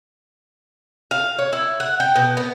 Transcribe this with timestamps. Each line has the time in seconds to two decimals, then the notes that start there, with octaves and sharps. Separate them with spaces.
1.11 F5
1.39 C#5
1.53 E4
1.80 F#5
2.00 G5
2.16 B2
2.37 B3